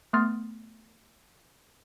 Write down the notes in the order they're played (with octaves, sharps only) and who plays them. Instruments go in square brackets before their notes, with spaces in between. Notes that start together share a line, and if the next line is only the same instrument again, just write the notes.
[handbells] A3 B3 C6 D#6 F6 A6